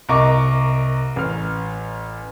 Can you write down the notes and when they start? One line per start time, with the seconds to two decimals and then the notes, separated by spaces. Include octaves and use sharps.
0.09 C2 A#4 D#5 C#6 D6
1.16 A1 F6